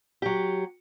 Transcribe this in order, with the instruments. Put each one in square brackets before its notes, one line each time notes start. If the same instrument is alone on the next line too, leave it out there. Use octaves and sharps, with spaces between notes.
[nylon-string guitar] F#3 G4